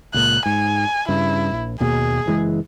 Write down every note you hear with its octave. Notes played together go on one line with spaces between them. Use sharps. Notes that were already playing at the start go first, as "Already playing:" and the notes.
C#2 A#2 F#6
G#2 G#5
G2 C#3 E4
A#1
D#2 B2 A#3 G#4
F#1 E3 G#3